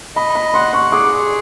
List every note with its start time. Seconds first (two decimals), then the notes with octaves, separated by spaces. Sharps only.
0.16 D#5 B5
0.35 B5
0.54 F#5 C6
0.73 C#6
0.92 G#4 D6